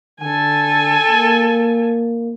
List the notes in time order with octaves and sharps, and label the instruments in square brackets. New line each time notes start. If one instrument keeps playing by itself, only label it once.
[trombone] D3 [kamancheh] A4 G#5
[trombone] A#3